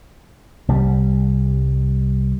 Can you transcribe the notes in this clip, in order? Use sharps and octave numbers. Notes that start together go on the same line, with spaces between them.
C2 G3